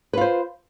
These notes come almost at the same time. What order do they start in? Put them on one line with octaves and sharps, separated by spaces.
B4 F4 C5